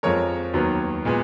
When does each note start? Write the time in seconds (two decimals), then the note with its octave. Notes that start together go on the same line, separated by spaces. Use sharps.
0.03 F2 F3 G#3 A#4 C#5
0.54 D#2 D#3 F#3 B3
1.05 A#2 G#3 B3